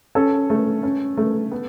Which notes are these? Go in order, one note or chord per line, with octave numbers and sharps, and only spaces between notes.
C#4 A4
A3
C#4
A3
B3